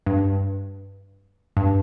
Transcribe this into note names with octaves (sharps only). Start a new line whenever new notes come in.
G2
G2